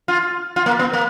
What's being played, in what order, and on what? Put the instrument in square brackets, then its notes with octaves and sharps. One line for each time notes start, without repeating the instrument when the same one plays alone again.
[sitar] F4
F4
A#3
B3
A#3